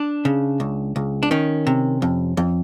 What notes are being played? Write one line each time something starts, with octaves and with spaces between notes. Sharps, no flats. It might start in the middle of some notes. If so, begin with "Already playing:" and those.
Already playing: D4
C#3
C#2
C#2
D4
D#3 C#4
C3
F2
F2